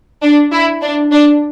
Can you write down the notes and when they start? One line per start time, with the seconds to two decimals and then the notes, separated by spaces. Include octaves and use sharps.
0.23 D4
0.53 E4
0.82 D4
1.12 D4